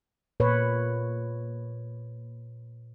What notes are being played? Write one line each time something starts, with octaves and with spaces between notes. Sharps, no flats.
A#2 B4 C#5